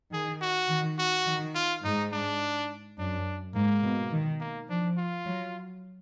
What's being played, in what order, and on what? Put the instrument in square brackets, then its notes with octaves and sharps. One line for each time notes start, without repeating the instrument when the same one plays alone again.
[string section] D#3 [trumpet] G#4
[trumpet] F#4
[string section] D#3
[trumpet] F#4
[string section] D#3
[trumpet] F4
[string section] G#2 [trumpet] D#4
[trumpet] D4
[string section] F#2 [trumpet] D4
[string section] G#2 [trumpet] A#3
[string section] B2
D#3
[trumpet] A#3
[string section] F3 [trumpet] D4
[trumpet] F4
[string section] F#3